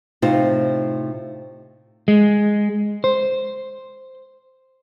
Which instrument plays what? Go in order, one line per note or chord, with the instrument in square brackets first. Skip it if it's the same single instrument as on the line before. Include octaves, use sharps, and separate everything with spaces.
[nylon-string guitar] A2 C3 D#4 F4 C5
[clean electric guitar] G#3
C5